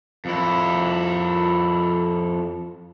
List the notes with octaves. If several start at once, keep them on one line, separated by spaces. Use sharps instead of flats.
F2 E4